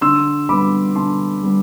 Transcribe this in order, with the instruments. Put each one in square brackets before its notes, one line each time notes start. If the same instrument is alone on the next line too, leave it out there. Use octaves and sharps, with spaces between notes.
[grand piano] D3 C6 E6
G3 B3 B5 D6
D3 A5 C6
G3 B3